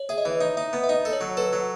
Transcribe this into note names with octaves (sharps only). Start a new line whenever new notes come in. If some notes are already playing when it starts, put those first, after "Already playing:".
Already playing: C#5
G#4 E5
D#5
E3 E5
D#4 D#5
D#4 E5
B3
E5
D#4 D#5
A4
C#5
F#3
A4 B4
F#3